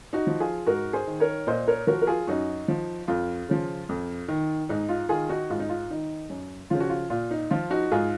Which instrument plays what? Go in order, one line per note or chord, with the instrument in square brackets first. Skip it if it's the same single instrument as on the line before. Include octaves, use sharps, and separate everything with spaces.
[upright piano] D#4 F#4
F3
F4 G#4
G#2 F#4 A#4
G#4 C5
D#3
A#4 C#5
A#2 C5 D#5
A#4 C#5
F3 F#4 A#4
A#4
F4 G#4
F#2 D#4 F#4
F3
F2 F4
C#3 F3
F2
D#3
G#2 D#4
F4
D#3 F4 G#4
D#4 F#4
G#2 F4
D#4
F4
D#3 D#4
F#2
C#3 F3 F4
F#4
F4
A#2 F4
D#4
F3 F4
D#4 F#4
G#2 F4 G#4